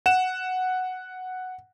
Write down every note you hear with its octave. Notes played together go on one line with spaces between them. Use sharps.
F#5 E7